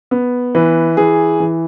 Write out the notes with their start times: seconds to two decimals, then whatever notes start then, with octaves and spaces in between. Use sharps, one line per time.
0.11 B3
0.55 E3 B4
0.97 E3 G#4
1.40 E3